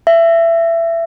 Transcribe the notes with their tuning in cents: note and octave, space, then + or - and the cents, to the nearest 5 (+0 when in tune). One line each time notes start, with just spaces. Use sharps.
E5 +20